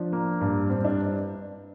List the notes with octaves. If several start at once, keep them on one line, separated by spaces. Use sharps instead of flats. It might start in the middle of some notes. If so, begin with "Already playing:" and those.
Already playing: F3 D4
A#3
G2
G2 C4
D4